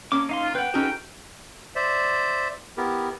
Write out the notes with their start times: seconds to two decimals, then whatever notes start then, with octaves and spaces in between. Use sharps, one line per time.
0.12 A#3 C#4 D6
0.29 D#4 F5 C6
0.43 F4
0.55 B4 F#5 G5
0.74 C#4 D#4 F#4 G#4 A4 B4 G5
1.76 C5 D5 E5
2.77 B3 E4 G4 A#4